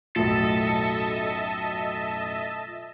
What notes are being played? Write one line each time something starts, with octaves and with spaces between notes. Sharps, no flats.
B1 F#2 A2 F4 A4 D#5 E5 A5